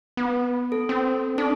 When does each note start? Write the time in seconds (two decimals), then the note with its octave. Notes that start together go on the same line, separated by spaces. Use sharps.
0.17 B3
0.72 A4
0.89 C4
1.38 D4 A4